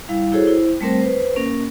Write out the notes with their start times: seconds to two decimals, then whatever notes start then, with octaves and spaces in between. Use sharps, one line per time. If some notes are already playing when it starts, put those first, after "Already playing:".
0.09 G3 E4 F5
0.32 E4 F#4 G#4 A4 C5 C#5
0.47 E4 C5
0.81 G3 A3 C4 A#4 C5
1.00 B4 C5
1.36 A#3 C#4 A#4